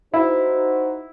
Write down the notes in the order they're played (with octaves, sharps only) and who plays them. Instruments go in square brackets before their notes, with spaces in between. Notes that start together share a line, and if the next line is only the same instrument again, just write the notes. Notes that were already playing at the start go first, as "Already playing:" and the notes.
[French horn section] D#4 F#4 C5 [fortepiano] E4